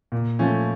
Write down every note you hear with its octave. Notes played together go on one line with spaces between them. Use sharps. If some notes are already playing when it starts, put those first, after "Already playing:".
A#2
F3 A3 C#4